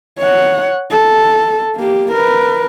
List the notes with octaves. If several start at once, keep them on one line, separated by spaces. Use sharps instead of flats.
C#5 F#5
A4
A#3 G4
A#4 B4